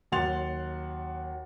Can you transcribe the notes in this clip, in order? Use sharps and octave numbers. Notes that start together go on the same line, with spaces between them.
D#2 F#3 F#5 C6 A6 F7